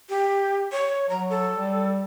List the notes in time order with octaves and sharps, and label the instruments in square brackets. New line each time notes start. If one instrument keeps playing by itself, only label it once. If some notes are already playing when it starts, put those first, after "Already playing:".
[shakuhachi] G4
C#5
[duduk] F#3 [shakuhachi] A#5
[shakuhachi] A4
[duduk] G3